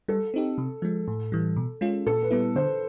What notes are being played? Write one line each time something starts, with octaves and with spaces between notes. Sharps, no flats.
G3 A4
C4 D#4 G4
C3
F3 G#3
A2
E3 G3
B2
G#3 C#4 F4
A#2 A4
B4
G3 B3 E4
D3 C5